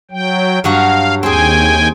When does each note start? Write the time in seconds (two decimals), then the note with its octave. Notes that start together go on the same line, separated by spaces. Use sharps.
0.11 F#3 G5
0.64 G2 F#3 F#4 F5
1.23 D#2 C4 G#4 G5 G#5